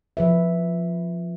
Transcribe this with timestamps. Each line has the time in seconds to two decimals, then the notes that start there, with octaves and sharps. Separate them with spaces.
0.17 F3 B4 E5